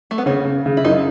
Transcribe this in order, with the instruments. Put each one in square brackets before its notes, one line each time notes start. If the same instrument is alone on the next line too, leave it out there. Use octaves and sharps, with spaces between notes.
[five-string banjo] A3
B3
[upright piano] C#3 [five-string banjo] C#4
[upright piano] C#3
C#3
[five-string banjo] E4
[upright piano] F#2 [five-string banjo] D#4